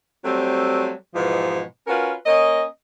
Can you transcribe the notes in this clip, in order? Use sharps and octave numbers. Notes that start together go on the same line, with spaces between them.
F#3 G3 A3 C4
G#2 B2 E3 F3 G#3
C#4 F4 F#4 A#4 B4
A#3 C#4 D#5